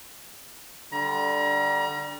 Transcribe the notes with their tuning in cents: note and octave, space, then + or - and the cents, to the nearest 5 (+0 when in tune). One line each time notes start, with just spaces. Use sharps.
D3 +0 G3 +0 A#5 +35